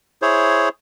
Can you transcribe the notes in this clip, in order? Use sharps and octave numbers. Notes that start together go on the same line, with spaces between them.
E4 G#4 C5 C#5